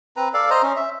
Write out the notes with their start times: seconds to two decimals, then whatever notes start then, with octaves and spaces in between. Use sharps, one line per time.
0.17 C4 B4 A#5
0.34 A4 D5 F5
0.50 C5 D#5 A#5
0.63 C#4
0.76 E5